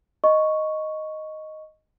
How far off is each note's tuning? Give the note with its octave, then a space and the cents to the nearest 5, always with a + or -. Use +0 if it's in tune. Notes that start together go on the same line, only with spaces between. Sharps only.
D#5 +0 C#6 +0